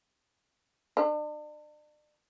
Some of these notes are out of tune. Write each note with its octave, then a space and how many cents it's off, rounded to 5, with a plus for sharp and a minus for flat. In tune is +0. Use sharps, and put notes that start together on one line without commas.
D4 +40